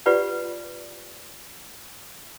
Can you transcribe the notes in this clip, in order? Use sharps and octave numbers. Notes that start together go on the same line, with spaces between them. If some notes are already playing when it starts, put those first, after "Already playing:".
F4 G4 B4 D5 F#5